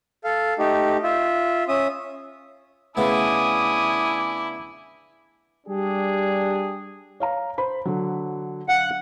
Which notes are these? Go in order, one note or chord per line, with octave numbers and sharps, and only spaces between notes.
A4 F5
A3 D#4 G4
F4 E5
C#4 E5 D#6
C#3 A3 B3 D4 E4 G#5 D6 D#6
G3 D4 G4 G#4
C#5 F5 A#5
C5 B5
D3 F#3
F5 F#5